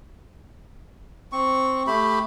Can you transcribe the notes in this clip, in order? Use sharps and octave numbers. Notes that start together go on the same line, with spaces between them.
C4 C#6
A3 G4 B5